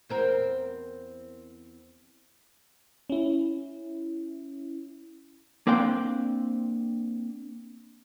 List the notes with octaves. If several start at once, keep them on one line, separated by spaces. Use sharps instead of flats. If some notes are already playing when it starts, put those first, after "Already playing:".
E2 C4 A#4
C#4 E4
A#3 C4 D4 G5